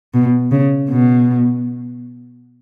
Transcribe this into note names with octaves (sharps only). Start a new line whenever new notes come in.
B2
C#3
B2